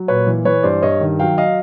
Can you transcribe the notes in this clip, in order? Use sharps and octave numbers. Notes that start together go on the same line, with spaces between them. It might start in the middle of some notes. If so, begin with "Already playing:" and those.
Already playing: F#3
A#2 B4 C#5
E3
E3 B4 C#5
G2 C5 D5
G2 C#5 D#5
D#3
F#3 F5 G5
D#5 F5